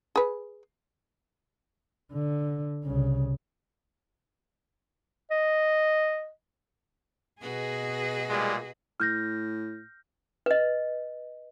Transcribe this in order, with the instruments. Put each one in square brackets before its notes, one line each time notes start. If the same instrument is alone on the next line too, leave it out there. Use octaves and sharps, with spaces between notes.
[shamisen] G#4 B4
[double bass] D3
C2 C#3
[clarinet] D#5
[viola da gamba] B2 F#4 B4 [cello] G#4 D#5
[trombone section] A#2 G3 G#3
[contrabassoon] A2 [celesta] F6 G6 A#6
[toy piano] B4 D#5